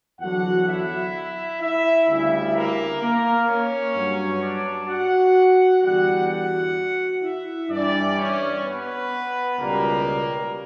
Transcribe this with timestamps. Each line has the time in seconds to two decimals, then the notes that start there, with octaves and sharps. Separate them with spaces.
0.20 E2 D3 F#3 F#4 F#5
0.67 E4 E5
1.61 E4 E5
2.07 D2 C#3 G3 E4 E5
2.54 A#3 A#4
3.01 A#3 A#4
3.48 C#4 C#5
3.95 G2 F#3
4.42 D4 D5
4.88 F#4 F#5
5.83 E2 D3 G3 F#4 F#5
6.30 F#4 F#5
7.23 E4 E5
7.70 G2 E3 G3 D4 D5
8.17 C#4 C#5
8.64 B3 B4
9.58 C#2 B2 G3 A#3 A#4